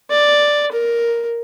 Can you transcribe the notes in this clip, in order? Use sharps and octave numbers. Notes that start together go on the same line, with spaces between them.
D5
A#4